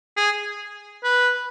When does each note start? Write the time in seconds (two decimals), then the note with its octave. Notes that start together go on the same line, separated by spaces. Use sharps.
0.17 G#4
1.04 B4